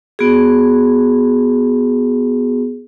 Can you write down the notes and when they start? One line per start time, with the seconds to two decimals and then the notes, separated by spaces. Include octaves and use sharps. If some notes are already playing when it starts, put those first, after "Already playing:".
0.19 B3 F#4 G#4